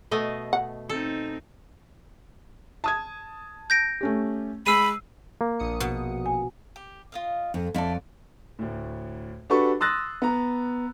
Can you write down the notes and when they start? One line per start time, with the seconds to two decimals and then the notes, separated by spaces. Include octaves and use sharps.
0.11 B2 A3 D#5
0.53 F#5
0.89 C4 D#4 A4
2.84 A5 D#6 G#6
3.70 G6 A#6 D7
4.01 A3 C#4 G4
4.66 G#3 B5 E6 C7 D#7
5.41 A#3
5.59 A#1 D#6 C#7
5.80 B2
6.26 G#5
6.76 G4
7.12 F4 D#5 F5
7.54 F2
7.74 F2 E4 A4 D5
8.59 D2 A2
9.50 D4 F#4 G4 A4 B4 C#6
9.80 C6 D#6 E6 F#6 A6 A#6
10.22 B3 A#5